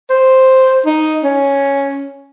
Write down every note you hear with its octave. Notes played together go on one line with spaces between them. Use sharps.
C5
D#4
C#4